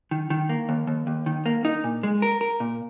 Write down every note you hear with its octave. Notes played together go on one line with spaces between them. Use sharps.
D#3
D#3
A#3
D#2
D#2
D#2
D#3
A#3
D#4
A#2
G#3
A#4
A#4
A#2